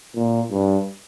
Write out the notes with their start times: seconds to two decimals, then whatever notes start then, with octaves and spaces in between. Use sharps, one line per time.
0.15 A#2
0.51 G2